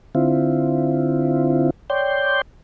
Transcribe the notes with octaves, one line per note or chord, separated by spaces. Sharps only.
D3 C4 E4 F4
C#5 D5 G5 C6 G6